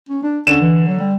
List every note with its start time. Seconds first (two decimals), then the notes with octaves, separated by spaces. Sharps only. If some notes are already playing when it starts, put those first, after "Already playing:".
0.09 C#4
0.23 D4
0.47 D3 C#4 E7
0.60 E3
0.86 F#3
0.99 G3